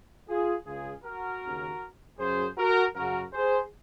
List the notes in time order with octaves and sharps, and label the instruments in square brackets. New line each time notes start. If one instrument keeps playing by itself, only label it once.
[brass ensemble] F4 G#4
C#2 C#3 F4 G#4
F#4 A#4
D#2 C#3
F#2 C#3 G#4 C5
F#4 A#4
F#2 C#3 F#4 A#4
G#4 C5